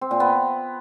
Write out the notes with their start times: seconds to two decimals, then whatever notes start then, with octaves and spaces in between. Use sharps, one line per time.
0.01 C4
0.11 A#2
0.20 B3